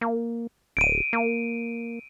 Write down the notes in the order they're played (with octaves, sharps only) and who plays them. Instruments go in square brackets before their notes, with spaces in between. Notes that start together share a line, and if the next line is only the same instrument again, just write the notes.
[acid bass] A#3
[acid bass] D1 [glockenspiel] D7 D#7
[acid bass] A#3